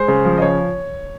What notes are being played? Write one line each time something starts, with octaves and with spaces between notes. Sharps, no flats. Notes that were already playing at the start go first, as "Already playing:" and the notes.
Already playing: G#3 C5
C#3
F3
D#5
C#3 C#5